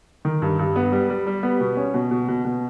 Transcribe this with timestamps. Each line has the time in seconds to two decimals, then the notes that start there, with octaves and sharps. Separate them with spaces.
0.25 D#3
0.42 G2
0.59 G2
0.76 B3
0.92 G3
1.10 G3
1.27 G3
1.43 B3
1.61 B2
1.77 C#4
1.94 B2
2.11 B2
2.28 B2
2.45 B2